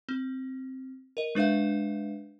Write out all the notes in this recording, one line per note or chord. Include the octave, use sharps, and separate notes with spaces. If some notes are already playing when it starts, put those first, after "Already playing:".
C4
A#4 D#5
G#3 D4 B4 E5 F5